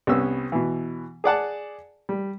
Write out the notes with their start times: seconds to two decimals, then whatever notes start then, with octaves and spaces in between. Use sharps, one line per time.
0.07 C2 B3 C#4 E6
0.52 B2 E3
1.24 G#4 D5 F#5 A5
2.09 G3